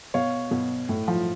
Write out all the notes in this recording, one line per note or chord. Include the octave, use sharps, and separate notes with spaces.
B2 C#5 F5
B2
A2
F3